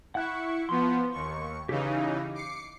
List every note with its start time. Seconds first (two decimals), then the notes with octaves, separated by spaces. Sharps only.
0.15 E4 F#5 C#6 F#6
0.69 F3 B3 C6
1.12 D#2 C#6
1.69 C#3 E3 D#4 G4 F5
2.34 D6 C7 C#7